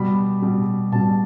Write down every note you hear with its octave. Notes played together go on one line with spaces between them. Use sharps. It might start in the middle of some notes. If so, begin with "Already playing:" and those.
Already playing: B2 G3 B5
B2 G3
B2 G3 A5